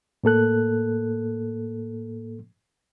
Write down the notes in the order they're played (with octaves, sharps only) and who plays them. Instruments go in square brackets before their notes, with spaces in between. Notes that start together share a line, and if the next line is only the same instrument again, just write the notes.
[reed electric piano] A2 A#3 A4 F#6